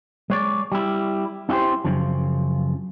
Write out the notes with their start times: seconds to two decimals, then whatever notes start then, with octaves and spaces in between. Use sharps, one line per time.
0.30 G#3 C#5 D5
0.72 G3 E4
1.49 C#4 E4 F#4 G4 C5
1.84 F#2 A#2 C#3 F3